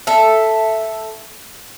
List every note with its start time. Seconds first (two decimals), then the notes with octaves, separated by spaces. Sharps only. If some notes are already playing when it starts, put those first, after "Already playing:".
0.07 A4 E5